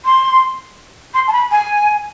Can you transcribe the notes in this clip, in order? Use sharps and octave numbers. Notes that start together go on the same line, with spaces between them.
C6
C6
A5
B5
G#5